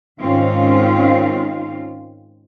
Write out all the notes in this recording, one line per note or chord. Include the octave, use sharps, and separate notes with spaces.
G#2 D#3 C4 C#4 F4 F5